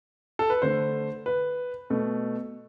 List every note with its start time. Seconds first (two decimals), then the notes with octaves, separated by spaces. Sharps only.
0.39 A4
0.50 B4
0.62 D3 A3 C5
1.26 B4
1.90 B2 A3